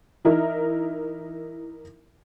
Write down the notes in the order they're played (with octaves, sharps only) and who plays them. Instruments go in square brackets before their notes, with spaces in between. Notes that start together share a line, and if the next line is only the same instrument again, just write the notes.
[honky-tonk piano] E3 D#4 E4 A#4 E5